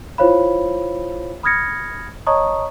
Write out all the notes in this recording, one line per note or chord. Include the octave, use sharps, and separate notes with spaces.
E4 F4 C5 C#5 F5 B5
B5 D#6 F6 G#6 A#6 C#7
C#5 D#5 A5 A#5 C#6 D#6